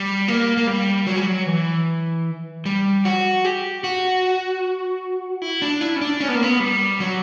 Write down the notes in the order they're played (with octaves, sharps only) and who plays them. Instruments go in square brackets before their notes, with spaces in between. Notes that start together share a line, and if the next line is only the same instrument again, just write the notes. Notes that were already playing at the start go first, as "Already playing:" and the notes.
Already playing: [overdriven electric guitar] G3
A#3
A#3
G3
F#3
G3
F#3
E3
G3
F#4
G4
F#4
E4
D4
E4
C#4
D4
C#4
B3
A#3
B3
G3
F#3